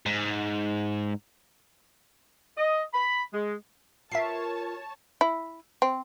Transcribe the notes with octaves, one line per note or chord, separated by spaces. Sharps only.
G#2
D#5
B5
G#3
F4 A#4 B4 C#5 E5 A5 C7
E4
C4